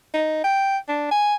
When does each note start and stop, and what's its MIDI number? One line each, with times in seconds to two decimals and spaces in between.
0.14 0.43 63
0.44 0.77 79
0.88 1.08 62
1.11 1.35 80